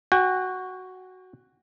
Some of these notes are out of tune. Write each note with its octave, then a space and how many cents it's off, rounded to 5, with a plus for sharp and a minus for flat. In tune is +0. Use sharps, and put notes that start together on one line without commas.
F#4 +0 G5 +40